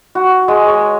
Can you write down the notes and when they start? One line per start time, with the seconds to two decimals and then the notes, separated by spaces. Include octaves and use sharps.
0.15 F#4
0.48 G#3
0.67 C#5